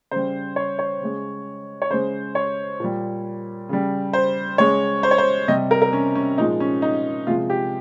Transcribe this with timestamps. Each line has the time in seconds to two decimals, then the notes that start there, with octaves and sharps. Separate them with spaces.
0.11 C#3 G3 C5
0.56 C#5
0.79 C#5
1.01 C#3 G#3
1.82 C#5
1.90 C#3 G#3 C5
2.35 C#5
2.80 A#2 G3
3.69 C#3 G3
4.13 C5
4.58 C#3 G#3 C#5
5.03 C5
5.11 C#5
5.18 C5
5.48 C3 G3 D#5
5.71 A#4
5.82 A#4
5.93 C#4
6.15 C#4
6.38 A#2 F3 G#3 D#4
6.60 C#4
6.82 D#4
7.27 C3 F3 G#3 F4
7.50 G4